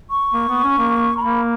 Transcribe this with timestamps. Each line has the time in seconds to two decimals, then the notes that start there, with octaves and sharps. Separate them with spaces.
0.10 C#6
0.33 A#3
0.49 B3
0.63 C#4
0.78 A#3
1.17 A#5
1.22 A#3 B5